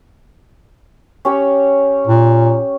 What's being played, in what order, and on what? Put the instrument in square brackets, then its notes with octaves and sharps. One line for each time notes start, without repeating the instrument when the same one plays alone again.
[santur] C#4 G4 C#5
[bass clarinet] A#2